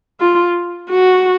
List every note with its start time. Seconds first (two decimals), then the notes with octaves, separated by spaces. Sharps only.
0.20 F4
0.90 F#4